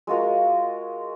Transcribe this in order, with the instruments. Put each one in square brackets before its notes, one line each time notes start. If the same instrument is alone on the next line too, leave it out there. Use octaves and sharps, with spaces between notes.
[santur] G#3 F4 F#4 A#4